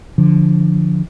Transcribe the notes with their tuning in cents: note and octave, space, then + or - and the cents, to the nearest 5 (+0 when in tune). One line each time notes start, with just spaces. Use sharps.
D3 +0 F3 +0